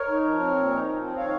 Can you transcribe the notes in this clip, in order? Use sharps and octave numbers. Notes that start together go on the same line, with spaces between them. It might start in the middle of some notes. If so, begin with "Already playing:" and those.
Already playing: A#4 C#5
D#4
F3
C4
A#2
D#4
F3
C4
D#3 C#5 F5